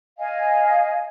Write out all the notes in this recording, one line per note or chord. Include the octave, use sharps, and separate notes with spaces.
D#5 F5 G#5